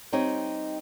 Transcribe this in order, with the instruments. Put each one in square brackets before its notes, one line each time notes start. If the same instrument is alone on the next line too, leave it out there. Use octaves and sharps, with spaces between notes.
[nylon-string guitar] G3 C4 D#4 G4 C#5 D#5